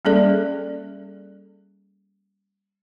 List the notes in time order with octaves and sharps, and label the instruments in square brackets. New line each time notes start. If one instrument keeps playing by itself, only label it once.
[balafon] G3 A#3 C#4 G#4 A4 D5